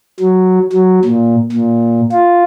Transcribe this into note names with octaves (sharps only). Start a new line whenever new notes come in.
F#3
F#3
A#2
A#2
F4